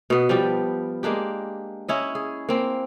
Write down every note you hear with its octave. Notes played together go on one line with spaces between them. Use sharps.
B2 B3
F3 G3 G4
G#3 A#3 D4 G4
C#4 E4 D#5
G#4
A#3 C4